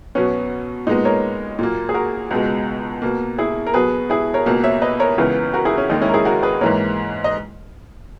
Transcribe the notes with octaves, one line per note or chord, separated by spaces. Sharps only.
B2 F#3 B3 C#4
A#2 G#3 B3 D#4
A#4 C#5
A#2 F#3 A#3
G#4
F#4 A#4
C#2 B2 G#3
B2 A#3
E4 G#4
A#4
B2 F#3 B3 G#4 B4
E4 G#4
A#4 C#5
C#2 B2 A#3
C#5 E5
B4 D#5
A#4 C#5
C#2 C#3 E3 B3
F#4 A#4
E4 G#4
C#4
D#2 D#3 G#3 D#4
C#4 E4
A#4
E4 G#4
F#4 A#4
G#4 B4
G#2 E3 A#3 A#4 C#5
D#5